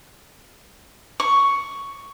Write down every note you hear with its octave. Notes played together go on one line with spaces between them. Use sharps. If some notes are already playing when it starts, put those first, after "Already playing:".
C#6